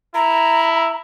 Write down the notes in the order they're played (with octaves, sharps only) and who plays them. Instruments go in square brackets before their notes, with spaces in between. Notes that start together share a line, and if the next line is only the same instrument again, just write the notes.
[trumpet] E4 [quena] A#5